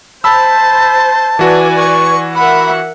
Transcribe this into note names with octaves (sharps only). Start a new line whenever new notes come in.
C5 A5 B5 E6
E3 F#4 B4 D5 G#5
C#6
A#4 E5 F#5 B5